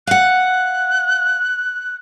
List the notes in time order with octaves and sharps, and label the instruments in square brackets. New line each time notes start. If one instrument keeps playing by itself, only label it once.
[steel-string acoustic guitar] F5 F#5 [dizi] F#6